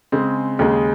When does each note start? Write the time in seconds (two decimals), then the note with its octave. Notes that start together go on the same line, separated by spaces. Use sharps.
0.12 C#3 G#3 C4
0.59 D#2 C#3 G#3